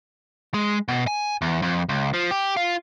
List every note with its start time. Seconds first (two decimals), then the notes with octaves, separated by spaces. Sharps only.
0.54 G#3
0.88 B2
1.07 G#5
1.42 E2
1.62 F2
1.89 C#2
2.14 F3
2.31 G4
2.57 F4